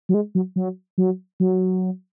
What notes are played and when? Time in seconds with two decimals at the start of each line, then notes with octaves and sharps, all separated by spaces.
0.09 F#3
0.14 G#3
0.35 F#3
0.56 F#3
0.98 F#3
1.40 F#3